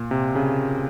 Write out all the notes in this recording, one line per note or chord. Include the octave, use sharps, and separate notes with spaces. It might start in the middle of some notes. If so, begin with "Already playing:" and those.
Already playing: A#2
C3
C#3